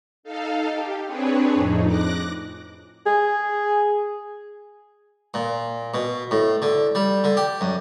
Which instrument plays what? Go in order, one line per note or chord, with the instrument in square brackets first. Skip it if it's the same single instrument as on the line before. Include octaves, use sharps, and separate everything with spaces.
[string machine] D#4 A4 F5
G4
C4 D4 G#4 B4 C#5
F2 A2 D#4
D6 F#6 A#6
[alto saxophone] G#4
[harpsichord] A#2
B2
A2
D3
G3
D3
G4
F#2